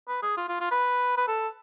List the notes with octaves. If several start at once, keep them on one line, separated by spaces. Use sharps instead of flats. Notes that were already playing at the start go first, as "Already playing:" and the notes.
B4
G#4
F4
F4
F4
B4
B4
A4